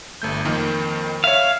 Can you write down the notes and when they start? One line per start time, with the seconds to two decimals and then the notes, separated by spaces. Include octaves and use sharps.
0.22 G1 A3 G6
0.45 F2 D#3 A#3
1.24 C#5 E5 F5